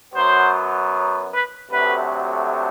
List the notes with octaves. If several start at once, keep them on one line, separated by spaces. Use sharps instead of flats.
F#2 F#3 B3 C5
B4
D2 C3 F#3 A3 B4